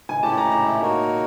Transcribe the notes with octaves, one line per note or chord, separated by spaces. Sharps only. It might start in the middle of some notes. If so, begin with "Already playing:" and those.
G#5
A3 C#4 E4 G4 A5
A#5
A#5
E5
A#3 D#4 F#4 A#4 C#5